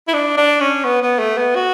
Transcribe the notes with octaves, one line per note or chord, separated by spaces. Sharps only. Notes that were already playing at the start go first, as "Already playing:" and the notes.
E4
D4
D4
C#4
B3
B3
A3
B3
F#4